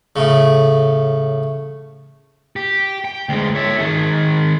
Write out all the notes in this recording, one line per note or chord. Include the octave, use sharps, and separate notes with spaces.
A2 C#3
G4
G5
D2 G#3
C#5 E5
D#3 G#4